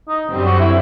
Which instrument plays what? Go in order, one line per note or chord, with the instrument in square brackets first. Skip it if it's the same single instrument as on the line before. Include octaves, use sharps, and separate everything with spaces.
[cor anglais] D#4
[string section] F#2 D3 G3 C4
[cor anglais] F#4
E4